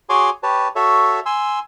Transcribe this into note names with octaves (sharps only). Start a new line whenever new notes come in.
F#4 G#4 C#5 G#5 C6 D6
G4 B4 C#5 A5
F#4 A4 C#5 E5
G#5 C6 E6